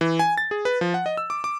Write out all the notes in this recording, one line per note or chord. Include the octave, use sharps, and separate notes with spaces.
E3
G#5
A6
G#4
B4
F3
F#5
D#5
E6
D6
D6